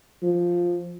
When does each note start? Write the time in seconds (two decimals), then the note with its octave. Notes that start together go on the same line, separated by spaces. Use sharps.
0.23 F3